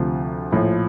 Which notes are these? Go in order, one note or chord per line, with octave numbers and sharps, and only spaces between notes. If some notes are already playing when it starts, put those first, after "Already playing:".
Already playing: D2 C3 F3
A#1 A2 F3